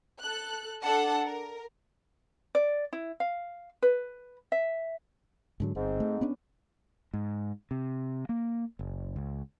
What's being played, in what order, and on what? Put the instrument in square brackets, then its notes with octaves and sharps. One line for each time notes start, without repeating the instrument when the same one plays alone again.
[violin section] A4 F#6
D4 A4 F#5 A5
A#4
[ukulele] D5
E4
F5
B4
E5
[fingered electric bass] G#2 D3 F#3
[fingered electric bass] G1 [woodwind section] G#2 C4
[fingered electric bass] A3
B3 C#4 D4
G#2
C3
A#3
F#1
C#2